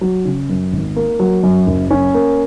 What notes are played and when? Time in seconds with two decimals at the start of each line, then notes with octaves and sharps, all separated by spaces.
0.01 F#3
0.25 C#3
0.49 F#2
0.73 G#1
0.96 A#3
1.20 F#3
1.43 F#2
1.67 F#1
1.91 C#4
2.14 A#3